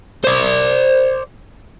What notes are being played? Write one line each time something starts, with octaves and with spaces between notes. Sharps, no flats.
C5 D5